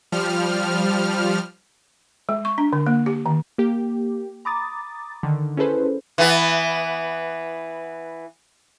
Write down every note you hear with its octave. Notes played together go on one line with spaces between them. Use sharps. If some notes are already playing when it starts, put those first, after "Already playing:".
F3 G3 F6
G#3
C#6
D4
D3
A#3
G4
D#3
A#3 G4
A#5 B5 D6 D#6 A6
D3 D#3
C#4 E4 G#4 A4 B4 C5
E3 B3